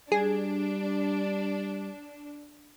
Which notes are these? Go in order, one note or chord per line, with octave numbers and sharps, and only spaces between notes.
G3 D4 G#4